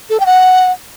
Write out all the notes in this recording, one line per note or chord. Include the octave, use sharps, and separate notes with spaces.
A4
G5
F#5